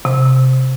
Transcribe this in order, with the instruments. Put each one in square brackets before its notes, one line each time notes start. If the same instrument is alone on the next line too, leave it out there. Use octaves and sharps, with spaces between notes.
[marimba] C3